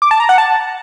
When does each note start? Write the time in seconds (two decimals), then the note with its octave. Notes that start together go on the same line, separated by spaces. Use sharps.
0.02 D6
0.11 A5
0.20 A#5
0.29 F#5
0.38 A5